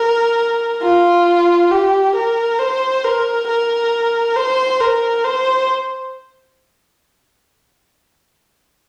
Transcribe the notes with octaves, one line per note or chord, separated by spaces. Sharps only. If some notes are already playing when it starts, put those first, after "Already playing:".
Already playing: A#4
F4
G4
A#4
C5
A#4
A#4
C5
A#4
C5